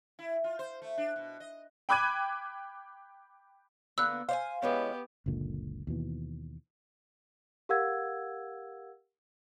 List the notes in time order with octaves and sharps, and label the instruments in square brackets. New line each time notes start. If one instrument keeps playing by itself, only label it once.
[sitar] E4
F4
C5
A3
D4
B2
D#5
[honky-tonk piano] G5 B5 D6 F#6 G#6 D#7
[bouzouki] D3 A#3 B3 [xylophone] E6 F#6
[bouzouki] C5 D5 G#5 [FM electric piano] F5
[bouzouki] E3 G#3 C#4 [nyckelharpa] B3 G4
[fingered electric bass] F#1 C#2 A#2 D3
D#2 B2 E3
[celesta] G4 A#4 F5 F#5 E6 G#6